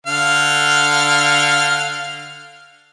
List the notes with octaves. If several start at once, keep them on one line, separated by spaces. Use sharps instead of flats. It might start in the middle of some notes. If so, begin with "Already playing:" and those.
D3 F5